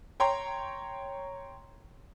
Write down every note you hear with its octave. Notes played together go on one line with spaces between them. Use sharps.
C#5 G5 A#5 C6